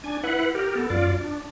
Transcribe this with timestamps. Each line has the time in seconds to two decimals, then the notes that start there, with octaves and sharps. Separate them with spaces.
0.04 D4 G#5
0.24 E4 B4 F#5
0.55 G4 A#4
0.75 B3 A4
0.90 F#2 F4 D5
1.20 D4